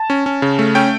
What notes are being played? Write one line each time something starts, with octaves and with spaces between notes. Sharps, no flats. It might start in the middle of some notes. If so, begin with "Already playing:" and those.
Already playing: A5
C#4
C#4
C#3
A3
C#4 G5